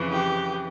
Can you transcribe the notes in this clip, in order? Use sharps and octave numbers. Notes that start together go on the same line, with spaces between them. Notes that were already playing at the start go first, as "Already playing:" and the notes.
Already playing: F2 C#3 E3
G4